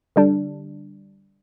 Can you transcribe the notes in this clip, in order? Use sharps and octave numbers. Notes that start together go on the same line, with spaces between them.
D3 G3 D4